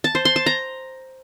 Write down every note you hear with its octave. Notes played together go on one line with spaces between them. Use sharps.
A5
C5
C6
A5
A#5